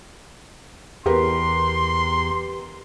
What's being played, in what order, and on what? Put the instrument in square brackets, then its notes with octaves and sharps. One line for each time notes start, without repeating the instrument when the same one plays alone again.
[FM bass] E2 [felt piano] G4 A#4 B4 [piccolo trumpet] C6